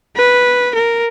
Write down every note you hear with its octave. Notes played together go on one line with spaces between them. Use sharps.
B4
A#4